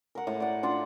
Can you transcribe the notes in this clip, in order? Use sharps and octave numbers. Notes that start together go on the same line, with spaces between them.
A#4 F#5
A2
D5 F#5
D4 F4 F#5